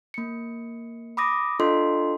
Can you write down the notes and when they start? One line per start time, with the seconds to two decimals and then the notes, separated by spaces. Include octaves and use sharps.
0.14 A#3 C#7
1.17 B5 D6 D#6 A#6
1.60 D4 F4 A4 D#5 C6